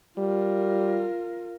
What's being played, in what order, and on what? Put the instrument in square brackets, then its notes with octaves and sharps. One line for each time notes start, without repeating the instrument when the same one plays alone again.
[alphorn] G3 [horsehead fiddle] F4 A#4